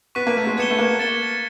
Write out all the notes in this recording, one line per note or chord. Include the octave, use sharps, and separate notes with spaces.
B3 C#6 F#6 B6 D#7
A#3
A3
G#3
B3 G#6 C#7 E7 G7
A3
A#3
A6 C#7 E7 G7